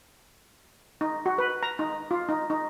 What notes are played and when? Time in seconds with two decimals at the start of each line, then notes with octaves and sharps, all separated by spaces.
1.01 D#4
1.26 F#4
1.38 B4
1.63 A#5
1.79 D#4
2.11 F4
2.29 D#4
2.50 D#4